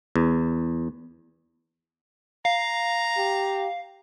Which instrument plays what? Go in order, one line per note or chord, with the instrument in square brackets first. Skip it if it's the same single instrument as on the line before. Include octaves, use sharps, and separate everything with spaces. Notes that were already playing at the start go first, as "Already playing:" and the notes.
[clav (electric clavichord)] E2
[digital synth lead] F5 [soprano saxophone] A#5
[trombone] G4